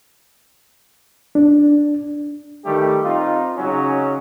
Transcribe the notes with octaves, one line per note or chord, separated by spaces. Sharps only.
D4
D#3 G3 A3 G4
C4 D#4 F4
C#3 F#3 C#4 D#4